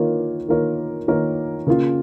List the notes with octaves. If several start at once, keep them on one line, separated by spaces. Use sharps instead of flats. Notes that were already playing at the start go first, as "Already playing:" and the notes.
Already playing: D#3 A#3 F4 A#4 C#5
D#3 A#3 F4 A#4 C#5
D#3 A#3 F4 A#4 C#5
C#3 A#3 F4